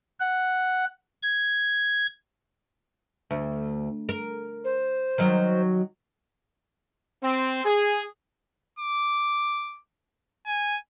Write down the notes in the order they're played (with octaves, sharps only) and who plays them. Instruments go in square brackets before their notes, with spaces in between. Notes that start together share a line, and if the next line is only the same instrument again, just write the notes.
[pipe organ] F#5
G#6
[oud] D2
A#4
[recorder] C5
[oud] D#3 F#3
[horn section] C4
G#4
[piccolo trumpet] D6
G#5